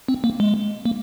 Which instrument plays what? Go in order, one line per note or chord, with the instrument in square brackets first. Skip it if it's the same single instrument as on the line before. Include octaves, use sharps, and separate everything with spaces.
[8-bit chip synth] C4
A#3
G#3
A#3